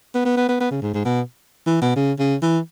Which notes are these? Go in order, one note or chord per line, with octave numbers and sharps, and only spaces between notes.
B3
B3
B3
B3
B3
C#3
G#2
G#2
B2
E3
B2
C#3
C#3
E3